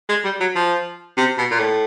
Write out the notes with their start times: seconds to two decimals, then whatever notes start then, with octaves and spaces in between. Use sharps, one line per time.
0.09 G#3
0.25 G3
0.40 F#3
0.55 F3
1.18 C3
1.38 B2
1.51 A#2
1.59 A2